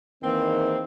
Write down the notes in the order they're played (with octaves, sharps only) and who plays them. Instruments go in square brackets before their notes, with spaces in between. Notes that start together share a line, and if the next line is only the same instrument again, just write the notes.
[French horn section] E2 E3 A#3 [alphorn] D#3 [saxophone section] C4